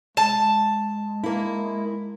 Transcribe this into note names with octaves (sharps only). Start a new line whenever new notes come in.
G#3 A5
A#3 E4